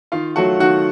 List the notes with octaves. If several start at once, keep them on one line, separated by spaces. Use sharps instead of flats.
D#3 F4 F5
F#3 A3 F#4 F#5
D#3 F#4 F#5